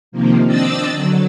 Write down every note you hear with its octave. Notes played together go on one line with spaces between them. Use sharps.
C3 D#3 F3 A#3
C4 D4 D5 D#5 E6 A6
D3 F#3